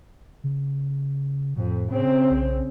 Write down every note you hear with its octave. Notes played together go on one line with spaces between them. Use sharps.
C#3
F2 A2
C#3 C4
B1